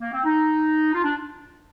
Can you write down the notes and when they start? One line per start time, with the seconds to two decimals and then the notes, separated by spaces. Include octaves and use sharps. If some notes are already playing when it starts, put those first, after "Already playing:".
0.01 A#3
0.13 C4
0.25 D#4
0.95 F4
1.04 D4